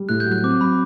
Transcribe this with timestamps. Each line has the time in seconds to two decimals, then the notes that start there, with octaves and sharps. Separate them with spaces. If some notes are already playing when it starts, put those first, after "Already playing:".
Already playing: G3
0.09 A2 F#6
0.20 G6
0.26 F#3
0.32 F#6
0.43 C4 D6
0.61 F#3 B5